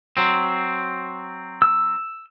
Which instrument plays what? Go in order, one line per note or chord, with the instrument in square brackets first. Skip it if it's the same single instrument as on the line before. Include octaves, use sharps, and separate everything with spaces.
[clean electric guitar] F#3 C4
[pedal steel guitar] E6